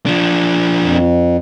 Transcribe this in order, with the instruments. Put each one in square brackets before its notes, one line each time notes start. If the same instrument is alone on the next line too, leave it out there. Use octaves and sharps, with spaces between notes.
[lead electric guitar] F3 D4
[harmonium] F2